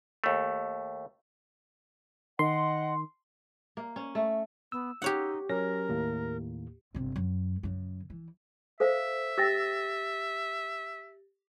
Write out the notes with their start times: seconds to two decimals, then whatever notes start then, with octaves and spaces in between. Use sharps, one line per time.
0.24 D#2 A3
2.39 D#3 D#5 F#5 G5 C6
3.77 A#3
3.96 C#4
4.15 A3
4.72 B3 E6
5.02 D#4 G4 C#5 F#5
5.49 F#3 C#4 A#4 A#6
5.89 D#2 A2 A#3
6.94 G1 C3
7.16 F#2
7.63 F#2 C#3
8.10 E3
8.80 A4 C5 E5 F5
9.38 G4 G5 E6 A6 A#6